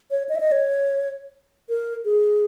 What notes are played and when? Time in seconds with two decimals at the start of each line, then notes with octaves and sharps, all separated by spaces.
0.11 C#5
0.29 D#5
0.35 E5
0.40 D#5
0.52 C#5
1.69 A#4
2.05 G#4